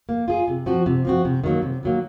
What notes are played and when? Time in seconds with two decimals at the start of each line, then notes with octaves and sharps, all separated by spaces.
0.09 A#3
0.28 F4 G#4
0.48 C3
0.66 F3 C4 F#4
0.86 C3
1.05 F3 C4 F#4
1.25 C3
1.44 D#3 F#3 A#3
1.62 C3
1.83 D#3 F#3 A#3